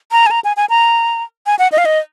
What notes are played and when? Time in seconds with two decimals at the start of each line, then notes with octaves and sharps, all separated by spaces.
0.12 A#5
0.26 G#5
0.31 A#5
0.44 G#5
0.57 G#5
0.70 A#5
1.46 G#5
1.59 F#5
1.72 D#5
1.78 F5
1.85 D#5